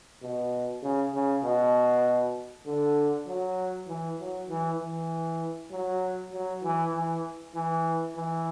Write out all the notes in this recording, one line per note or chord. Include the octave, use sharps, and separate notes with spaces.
B2
C#3
C#3
B2
D3
F#3
E3
F#3
E3
E3
F#3
F#3
E3
E3
E3
E3